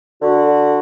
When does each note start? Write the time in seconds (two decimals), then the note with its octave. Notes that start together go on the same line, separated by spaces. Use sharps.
0.22 D3 F#4